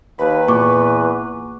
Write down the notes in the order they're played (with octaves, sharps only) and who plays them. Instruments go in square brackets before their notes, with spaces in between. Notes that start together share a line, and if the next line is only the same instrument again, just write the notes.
[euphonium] D#2 [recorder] B4 [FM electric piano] B5
[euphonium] E2 [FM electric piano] A#2 [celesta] C#6 D6